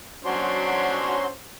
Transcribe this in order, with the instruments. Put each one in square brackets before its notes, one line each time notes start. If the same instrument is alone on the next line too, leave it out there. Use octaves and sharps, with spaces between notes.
[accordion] F#3 F#4 C6 [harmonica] C#4 D4 C5